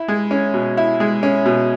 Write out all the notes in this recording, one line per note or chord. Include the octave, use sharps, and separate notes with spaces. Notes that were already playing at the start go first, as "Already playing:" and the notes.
Already playing: E4
G#3
C#4
B2
E4
G#3
C#4
B2